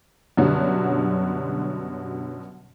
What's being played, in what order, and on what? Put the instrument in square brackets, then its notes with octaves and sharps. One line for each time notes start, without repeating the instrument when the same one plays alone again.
[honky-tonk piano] F#2 B2 D3 F#3 G3